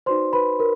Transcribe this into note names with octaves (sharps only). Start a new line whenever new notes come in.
D#4 F#4 B4 C5 D5 C6
B4 B5
A#4